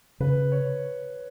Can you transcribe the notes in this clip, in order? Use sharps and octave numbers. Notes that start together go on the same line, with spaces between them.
C#3 B4
C#5